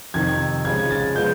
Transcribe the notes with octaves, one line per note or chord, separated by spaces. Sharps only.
F2 C3 D#3 G#6
C#3 F3 G#3 G#6
A6
C#3 F3 G#3 B3 G6